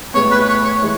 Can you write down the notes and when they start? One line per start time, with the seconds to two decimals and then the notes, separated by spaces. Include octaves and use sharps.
0.14 A2 G#3 B3 C#5
0.31 B4
0.48 C#5
0.65 C#5
0.82 E3 G#3